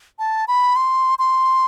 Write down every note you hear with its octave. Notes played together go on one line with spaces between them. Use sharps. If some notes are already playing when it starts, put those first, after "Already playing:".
A5
B5
C6
C6